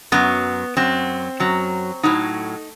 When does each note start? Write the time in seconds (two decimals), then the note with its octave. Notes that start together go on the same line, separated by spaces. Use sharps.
0.12 F#2 F#3 B3
0.77 F#2 F#3 C4
1.40 F#2 F#3
2.03 A2 F#3 D#4